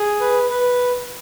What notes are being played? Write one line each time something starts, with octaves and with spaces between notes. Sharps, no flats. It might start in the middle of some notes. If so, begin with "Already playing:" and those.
Already playing: G#4
B4
B4